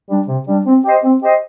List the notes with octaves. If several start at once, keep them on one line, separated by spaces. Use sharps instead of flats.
G3 D4
C3
G3 D4
C4
G4 C5 D#5
C4
G4 C5 D#5